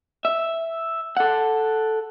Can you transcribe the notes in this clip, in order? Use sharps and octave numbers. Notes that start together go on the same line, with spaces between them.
E5
A4 F#5